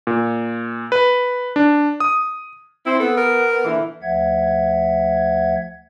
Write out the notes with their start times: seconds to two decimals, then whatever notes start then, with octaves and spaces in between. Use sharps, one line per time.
0.07 A#2
0.92 B4
1.56 D4
2.00 D#6
2.86 C4 E4
3.00 B3 A4
3.17 A#4
3.64 A#2 D3 E3
4.02 D2 F3 E5 F#5 G#6